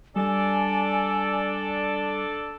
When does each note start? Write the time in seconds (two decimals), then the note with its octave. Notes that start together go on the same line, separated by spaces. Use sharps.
0.16 G3 D4 A4 D5 G#5